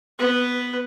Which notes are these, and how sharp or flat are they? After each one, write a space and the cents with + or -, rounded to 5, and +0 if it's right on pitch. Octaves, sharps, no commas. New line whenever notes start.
B3 +0 B4 +0